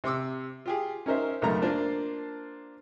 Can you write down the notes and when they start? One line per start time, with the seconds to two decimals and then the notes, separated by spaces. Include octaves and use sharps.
0.04 C3 C6 D6 E6
0.66 F4 G4 G#4
1.06 C#4 D#4 A#4 C5 E5
1.42 B1 F#2 C#3 A3 A#4 A#5
1.62 A#3 D4 F4 C5 A5